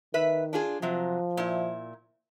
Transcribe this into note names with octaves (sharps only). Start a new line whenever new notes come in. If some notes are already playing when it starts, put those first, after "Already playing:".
D#3 B4 E5
D4 F4 G#4
C3 F3 F#3
A#2 E4